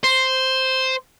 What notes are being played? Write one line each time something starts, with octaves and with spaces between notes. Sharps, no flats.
C5